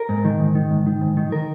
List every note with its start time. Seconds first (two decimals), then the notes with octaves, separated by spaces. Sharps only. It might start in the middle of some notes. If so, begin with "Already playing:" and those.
Already playing: A#4
0.09 G#2
0.25 D#3
0.40 G#2
0.55 D#3
0.71 G#2
0.86 D#3
1.01 G#2
1.17 D#3
1.32 D#3 A#4